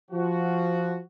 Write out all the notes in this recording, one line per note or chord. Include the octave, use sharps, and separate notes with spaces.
F3 F#4